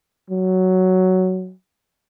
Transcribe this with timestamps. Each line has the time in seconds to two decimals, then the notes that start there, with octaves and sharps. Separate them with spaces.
0.30 F#3